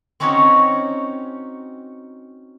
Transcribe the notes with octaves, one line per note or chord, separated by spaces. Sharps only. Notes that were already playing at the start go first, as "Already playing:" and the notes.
C4 C#4 D#4 F#4 G4 C#5